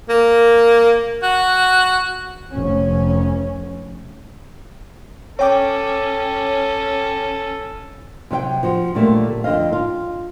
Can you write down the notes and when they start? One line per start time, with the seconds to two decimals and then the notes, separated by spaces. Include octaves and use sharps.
0.09 A#3
1.23 F#4
2.53 F1 C#4
5.39 C#4 A4 C#5 G5 D6
8.31 C3 F#3 E5 G5
8.63 F3 F#4
8.95 A#2 D3 F#3 G3 A3 A#3
9.44 F2 D3 D#5 F5
9.72 F4